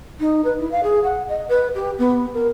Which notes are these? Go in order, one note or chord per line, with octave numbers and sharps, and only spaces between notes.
D#4
B4
E4
F5
G#4
F#5
D#5
B4
G4
B3
A#4